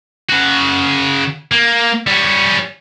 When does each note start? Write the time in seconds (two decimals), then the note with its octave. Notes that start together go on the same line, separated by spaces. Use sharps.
0.29 C#3 F#4
1.52 A#3
2.07 G3 C#4